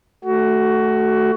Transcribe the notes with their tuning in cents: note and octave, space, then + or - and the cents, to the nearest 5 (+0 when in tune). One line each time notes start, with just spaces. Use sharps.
A3 +0 F#4 +20